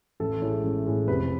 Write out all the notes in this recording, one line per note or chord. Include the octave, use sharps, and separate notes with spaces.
A1 A4
A2 G#3
A1
A2 G#3
F1 B4